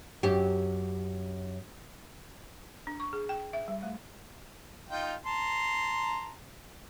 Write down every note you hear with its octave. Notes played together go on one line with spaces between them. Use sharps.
F#2 G4
D4
C#6
G#4
G5
E5
G3
A3
D#4 F4 G5
A5 A#5 C6